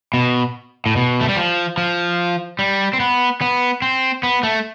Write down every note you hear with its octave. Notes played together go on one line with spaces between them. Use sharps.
B2
A2
B2
A3
G3
F3
F3
G3
C4
B3
B3
C4
B3
A3